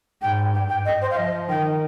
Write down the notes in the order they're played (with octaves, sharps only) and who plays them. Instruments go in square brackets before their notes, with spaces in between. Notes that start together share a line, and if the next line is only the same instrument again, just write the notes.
[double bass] G#2 [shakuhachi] G5
[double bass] G2 [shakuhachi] G5
[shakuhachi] G5
D#5
C5
F5
[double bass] F3 [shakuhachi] D#5
[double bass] D#3 [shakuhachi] G5